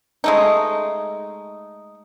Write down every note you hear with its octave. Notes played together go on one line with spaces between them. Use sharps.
G#3 A3 D#4